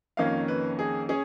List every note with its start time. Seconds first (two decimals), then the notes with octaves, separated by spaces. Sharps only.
0.17 F2 D#3 A#3 C#4 F5
0.48 B4
0.79 G#4
1.09 C#4 G#4